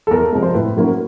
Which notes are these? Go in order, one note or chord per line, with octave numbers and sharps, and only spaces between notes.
A4
E2 A#4
C3 F3 G#3
C5
A2 B4
F#3 A#3 C#4